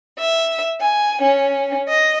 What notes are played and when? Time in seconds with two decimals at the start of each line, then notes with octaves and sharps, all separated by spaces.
0.18 E5
0.81 G#5
1.21 C#4
1.87 D#5